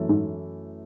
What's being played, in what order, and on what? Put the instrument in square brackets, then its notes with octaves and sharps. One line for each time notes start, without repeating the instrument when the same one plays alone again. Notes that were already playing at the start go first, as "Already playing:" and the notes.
Already playing: [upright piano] F#2 E3 A3
[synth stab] G#2